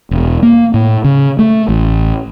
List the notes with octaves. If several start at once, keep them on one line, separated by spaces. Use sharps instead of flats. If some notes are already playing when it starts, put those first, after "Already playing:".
E1
A#3
A2
C#3
A3
A1